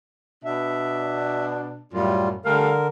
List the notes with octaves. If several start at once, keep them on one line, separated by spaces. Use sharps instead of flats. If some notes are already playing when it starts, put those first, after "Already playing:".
B2 D4 E5
F#2 A2 G3 F4
D3 G3 A3 A#4 F5